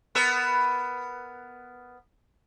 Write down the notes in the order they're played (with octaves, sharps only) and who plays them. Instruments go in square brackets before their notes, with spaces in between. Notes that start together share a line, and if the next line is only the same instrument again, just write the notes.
[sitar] B3 A#4 E5